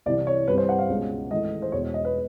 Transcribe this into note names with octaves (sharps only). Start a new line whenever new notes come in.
C2 C3 E3 D5
C#5
G2 E3 G3 C4 B4
C5
F#5
F5
C#2 B2 G#3 C#4
G#1 G#2 E3 A3 D#5
C5
E1 E2 B2 C#5
D#5
B4